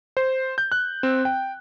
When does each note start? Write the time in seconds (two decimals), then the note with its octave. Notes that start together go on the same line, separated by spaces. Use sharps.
0.17 C5
0.58 G6
0.72 F#6
1.03 C4
1.25 G5